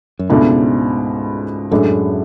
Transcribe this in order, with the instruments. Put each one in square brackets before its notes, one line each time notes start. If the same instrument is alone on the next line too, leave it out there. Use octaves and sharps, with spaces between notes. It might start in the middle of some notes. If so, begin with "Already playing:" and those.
[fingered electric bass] F#2
[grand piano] C#2 B2 A3 D4 [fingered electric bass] G#2
[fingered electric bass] F#2 [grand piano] A2 G#3 D4 A4